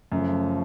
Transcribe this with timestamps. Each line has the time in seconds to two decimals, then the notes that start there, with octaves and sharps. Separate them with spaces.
0.12 F#2 C#3 F3 A3